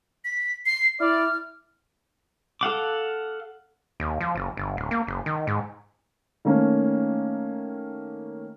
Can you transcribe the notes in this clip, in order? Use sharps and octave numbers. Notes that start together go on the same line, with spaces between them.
B6
C7
E4 D5 F6
A4 F5 F#5 D6
D#2
F3
F#1
G1
D1
A#3
F#1
D#3
G#2
D#3 A3 A#3 C#4